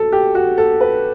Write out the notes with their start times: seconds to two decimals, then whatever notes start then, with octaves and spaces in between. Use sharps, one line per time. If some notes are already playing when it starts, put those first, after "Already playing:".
Already playing: B2 A4
0.12 G4
0.35 F#4
0.58 A4
0.81 B4